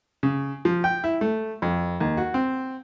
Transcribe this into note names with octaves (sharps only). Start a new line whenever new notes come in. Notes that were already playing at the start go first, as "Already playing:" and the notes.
C#3
F3
G5
E4
A3
F2
D#2
F#4
C4